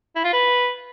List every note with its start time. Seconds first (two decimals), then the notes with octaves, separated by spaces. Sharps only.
0.16 E4
0.24 F4
0.33 B4